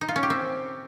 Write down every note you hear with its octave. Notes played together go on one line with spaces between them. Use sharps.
D#4
F4
C#4
G4
C4